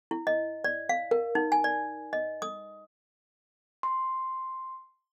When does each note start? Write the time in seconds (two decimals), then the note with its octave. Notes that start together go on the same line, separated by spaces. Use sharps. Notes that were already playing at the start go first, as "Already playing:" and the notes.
0.11 E4
0.27 D#5
0.64 D5
0.89 F5
1.11 A#4
1.35 D#4
1.52 G#5
1.64 D5
2.13 D#5
2.42 D#6
3.83 C6